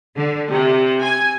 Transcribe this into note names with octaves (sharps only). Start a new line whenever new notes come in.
D3
C3
G#5